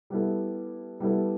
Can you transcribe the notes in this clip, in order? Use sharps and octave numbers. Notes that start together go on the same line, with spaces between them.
G3 B3 E4 A4
G3 B3 E4 A4